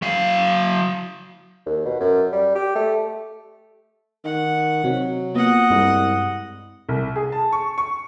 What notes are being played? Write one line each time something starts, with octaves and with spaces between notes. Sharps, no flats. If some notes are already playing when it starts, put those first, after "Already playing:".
F#3 F5
D#2
B2
F#2
G3
G4
A3
D#3 F#5
C3 F#3 C4
A#3 B3 F4 D#5 F#5
C2 G2 G#3
C2
G#4
A5
C#6
C#6